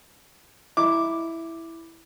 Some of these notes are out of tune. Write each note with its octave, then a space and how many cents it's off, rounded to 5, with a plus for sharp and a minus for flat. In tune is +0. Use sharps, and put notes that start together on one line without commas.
E4 +0 D6 +0